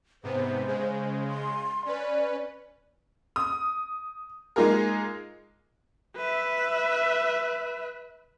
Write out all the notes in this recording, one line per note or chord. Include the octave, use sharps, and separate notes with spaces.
G#2 C3 B3 C5
C#3 G#3
C6
C#4 B4 D5
D#6
G#3 A#3 D#4 F4 G#4 A#4
B4 E5